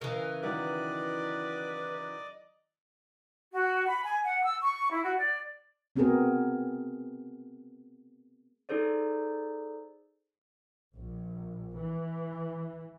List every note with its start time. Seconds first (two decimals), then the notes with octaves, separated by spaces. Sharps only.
0.01 C#3 E3 A#4 D#5
0.43 D#3 F#3 E4 B4 D5 D#5 D6
3.52 F#4
3.87 B5
4.03 G#5
4.24 F#5
4.43 E6
4.61 C#6
4.91 E4
5.04 F#4
5.17 D5
5.96 A3 B3 C4 F#4 G#4 A#4
8.69 D#4 G#4 A4 C5 D5
10.95 A#1
11.76 E3